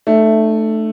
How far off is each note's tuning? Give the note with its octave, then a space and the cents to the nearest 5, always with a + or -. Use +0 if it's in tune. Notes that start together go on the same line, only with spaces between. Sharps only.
A3 +0 D#4 -45